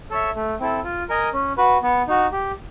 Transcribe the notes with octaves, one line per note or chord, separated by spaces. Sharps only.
A4 C#5 E5
A3
C4 E4 A4
F4
A#4 D#5 G#5
C#4
F#4 B4
B3
D#4 F#4
G4